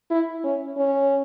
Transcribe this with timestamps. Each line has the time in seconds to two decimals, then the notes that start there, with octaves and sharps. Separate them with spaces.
0.11 E4
0.44 C#4
0.77 C#4